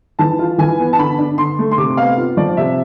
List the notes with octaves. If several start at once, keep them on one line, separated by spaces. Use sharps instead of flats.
E3 A5
F4
E3 G#5
B3
A5
D3 B5
D4
D3 C6
A3
C6
C3 D6
B3 F5
F4
F3 D5
C3 E5